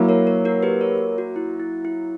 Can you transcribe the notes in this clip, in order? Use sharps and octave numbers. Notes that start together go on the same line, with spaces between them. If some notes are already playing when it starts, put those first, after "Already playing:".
Already playing: F#3 A#3 E4
A#4 C#5
A#4 C#5
F#4 A#4
G4 B4
A#4 C#5
F#4
E4
E4
E4